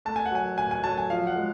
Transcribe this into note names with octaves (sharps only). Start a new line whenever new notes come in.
A3 A5
G#5
F#5
F#3 G#5
A2 G#5
G#5
F#3 A5
G#5
F3 F5
F#5
G#3